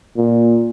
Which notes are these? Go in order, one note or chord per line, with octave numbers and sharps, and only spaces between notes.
A#2